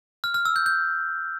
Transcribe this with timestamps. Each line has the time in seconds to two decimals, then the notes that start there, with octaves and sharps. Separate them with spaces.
0.24 F6
0.34 F6
0.45 E6
0.56 G6
0.66 G6